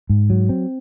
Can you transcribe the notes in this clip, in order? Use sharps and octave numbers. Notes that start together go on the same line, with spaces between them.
G#2
F#3
C4